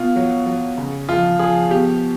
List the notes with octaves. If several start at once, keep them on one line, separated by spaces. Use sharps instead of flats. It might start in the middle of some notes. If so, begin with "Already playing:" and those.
Already playing: B2 F4
F#3
F#3
C#3
F3 F4
F3 G#4
B2 G4